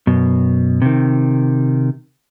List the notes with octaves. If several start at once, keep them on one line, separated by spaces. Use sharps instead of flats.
F#2 B2
C3 D#3